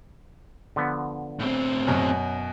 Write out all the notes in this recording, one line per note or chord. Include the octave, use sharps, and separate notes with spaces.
D3 F3 B3
A2 C4
F#2 B2 C#4